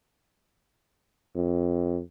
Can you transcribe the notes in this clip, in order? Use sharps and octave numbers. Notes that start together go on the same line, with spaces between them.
F2